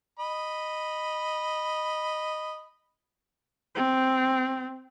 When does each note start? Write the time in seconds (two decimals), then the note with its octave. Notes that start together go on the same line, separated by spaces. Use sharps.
0.19 D#5 B5
3.75 C4